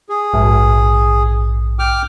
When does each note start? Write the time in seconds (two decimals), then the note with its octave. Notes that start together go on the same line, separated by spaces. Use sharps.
0.09 G#4
0.33 A#1 G#2
1.79 G5 D6 F6